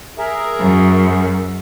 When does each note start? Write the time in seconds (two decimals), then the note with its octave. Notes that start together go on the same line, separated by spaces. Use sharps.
0.18 G#4 A#4 E5
0.60 F#2